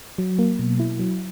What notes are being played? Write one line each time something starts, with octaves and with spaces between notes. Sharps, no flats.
F#3
A#3
B2
E4
F#3